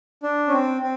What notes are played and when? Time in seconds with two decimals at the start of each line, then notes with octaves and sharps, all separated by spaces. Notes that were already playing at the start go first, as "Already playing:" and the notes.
0.23 D4
0.48 C#4
0.53 C4
0.82 C4